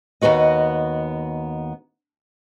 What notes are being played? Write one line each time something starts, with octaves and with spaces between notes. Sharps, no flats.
D#2 C#3 B3 F#4 D#5